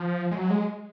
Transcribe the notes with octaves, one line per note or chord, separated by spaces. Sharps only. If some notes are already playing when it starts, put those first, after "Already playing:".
Already playing: F3
G#3
F#3
G#3